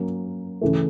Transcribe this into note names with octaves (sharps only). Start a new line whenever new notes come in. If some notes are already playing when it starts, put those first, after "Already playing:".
Already playing: F#3 A#3 C#4
C#3 E3 A3